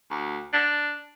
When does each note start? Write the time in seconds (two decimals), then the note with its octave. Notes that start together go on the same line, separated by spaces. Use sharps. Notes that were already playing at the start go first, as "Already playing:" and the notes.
0.11 D2
0.53 D4